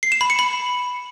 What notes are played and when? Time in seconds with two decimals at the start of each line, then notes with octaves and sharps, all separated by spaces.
0.03 C7
0.12 E7
0.21 B5
0.30 C#7
0.39 B5